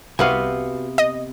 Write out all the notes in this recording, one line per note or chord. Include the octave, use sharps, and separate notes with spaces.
C2 C3 B3 F#4 B4 F5 G#5
D#5